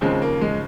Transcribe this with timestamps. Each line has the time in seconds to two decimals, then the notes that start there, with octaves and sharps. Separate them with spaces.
0.01 D#2 C#3 F3 G#3 C4
0.22 A#3
0.41 G#3